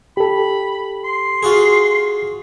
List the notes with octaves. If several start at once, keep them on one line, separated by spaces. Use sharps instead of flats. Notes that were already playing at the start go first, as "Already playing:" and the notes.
G4 A4 B5
C6
F4 F#4 G#4